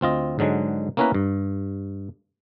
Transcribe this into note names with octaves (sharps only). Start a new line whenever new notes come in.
D2 C4 F4 D#5
G#2 D3 F#3 G#3
A#3 B3 C#4 E4 A#4 B4
G2